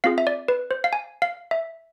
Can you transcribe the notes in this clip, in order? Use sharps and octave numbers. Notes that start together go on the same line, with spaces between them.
C4 F4 G#4 F5
E5
D5
B4
C5
F5
G#5
F5
E5